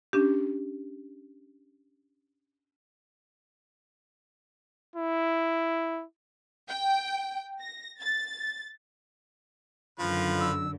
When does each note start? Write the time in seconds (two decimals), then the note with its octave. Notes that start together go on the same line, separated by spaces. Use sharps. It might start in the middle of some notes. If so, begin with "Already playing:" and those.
0.13 C#4 D4 G4
4.96 E4
6.68 G5
7.60 A#6
8.00 A6
9.99 F#2 D3 D#3 F3 F4 B4
10.41 E6